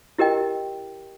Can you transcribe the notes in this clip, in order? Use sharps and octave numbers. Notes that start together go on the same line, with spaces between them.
E4 G4 A#4 D#5 G5